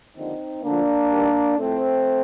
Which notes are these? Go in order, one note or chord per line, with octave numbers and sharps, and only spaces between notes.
D#2 D3 F3 C4 D#4
D2 D3 F3 A#3 D4
G2 D#3 G3
A2 F3 A3 C4